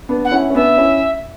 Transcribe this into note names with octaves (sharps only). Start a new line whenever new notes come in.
B3 D4
F#5
C#4 E4
C#4
B3 D4 E5
C#4 E4